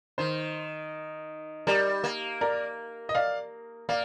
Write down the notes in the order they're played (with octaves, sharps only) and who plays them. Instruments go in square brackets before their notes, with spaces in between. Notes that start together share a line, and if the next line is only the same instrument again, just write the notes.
[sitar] D#3 [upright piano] C5
[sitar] G3 [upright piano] A#4 D5
[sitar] A#3
[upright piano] A#4 D5
D#5
D5 F5
[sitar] A#3 [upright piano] D5 F5